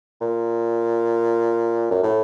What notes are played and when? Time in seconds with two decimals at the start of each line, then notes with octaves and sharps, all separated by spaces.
0.21 A#2
1.91 F#2
2.03 A2